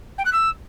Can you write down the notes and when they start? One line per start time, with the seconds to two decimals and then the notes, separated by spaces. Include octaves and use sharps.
0.18 G5
0.25 F#6
0.33 E6